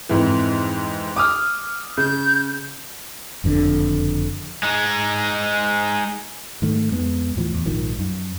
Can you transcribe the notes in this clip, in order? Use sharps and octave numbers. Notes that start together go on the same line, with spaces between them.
F2 G#2 E3
D6 D#6 F6
C#3 G6
F#1 F2 A2 D3
G#3 D#4
G#2 D#3 A3
F2 G#3 B3
D2 A2 E3 F3
E2
A#1 G#2 D#3 F3
F#2